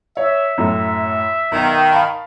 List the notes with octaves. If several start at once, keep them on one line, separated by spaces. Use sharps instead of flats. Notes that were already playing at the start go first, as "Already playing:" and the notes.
C#5 E5
F#2 A2 A4
B1 D#3
F5 A5 B5